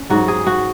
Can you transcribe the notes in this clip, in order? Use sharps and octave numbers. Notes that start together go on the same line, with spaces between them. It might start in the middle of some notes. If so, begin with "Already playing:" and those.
Already playing: C#4
G#2 F#3 F#4
G#4
F#4